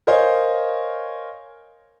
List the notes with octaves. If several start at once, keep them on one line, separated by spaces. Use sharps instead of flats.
A#4 C5 C#5 D#5 F5 G#5